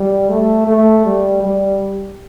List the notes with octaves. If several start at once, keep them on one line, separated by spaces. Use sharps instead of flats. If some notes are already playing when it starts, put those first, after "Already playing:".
Already playing: G3
A3
A3
G3
G3